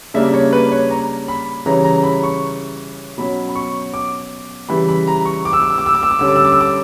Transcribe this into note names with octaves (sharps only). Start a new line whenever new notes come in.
C#3 G3 A#3 D4 E5
C#5
B4
C#5
A#5
B5
C#3 E3 G3 C#4 A#5
A#5
B5
C#6
B2 F#3 C#4 B5
B5
C#6
D6
C#3 E3 G3 B5
B5
A#5
C#6
D6
E6
D6
E6
D6
E6
D6
E6
D6
D3 G3 C#4 E6
D6
E6
D6
E6
D6